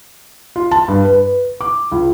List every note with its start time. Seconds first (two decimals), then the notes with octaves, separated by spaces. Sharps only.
0.56 F4
0.71 A5
0.88 G2
1.05 B4
1.61 D6
1.92 C#2